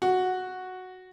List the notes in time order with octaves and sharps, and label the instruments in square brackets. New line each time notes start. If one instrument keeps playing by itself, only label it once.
[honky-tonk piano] F#4